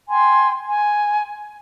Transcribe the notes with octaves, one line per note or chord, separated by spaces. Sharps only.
G5 G#5 C6
G#5